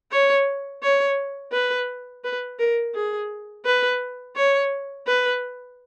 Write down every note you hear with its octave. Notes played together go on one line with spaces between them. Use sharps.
C#5
C#5
B4
B4
A#4
G#4
B4
C#5
B4